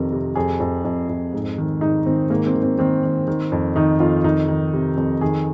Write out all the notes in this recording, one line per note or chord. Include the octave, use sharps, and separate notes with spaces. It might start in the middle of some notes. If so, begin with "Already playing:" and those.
Already playing: F2 C3 D#3 A#4
C3
F2 G#4
F2
F2
F2
G#2
D#3
G#2 D#4
D#3 C4
G#2 A#3
C4
D#3
C4
D#3 C4
D#3
D#3
F2
D#3 D#4
F2 F4
D#3 D#4
D#3
C3
F2
D#3 G#4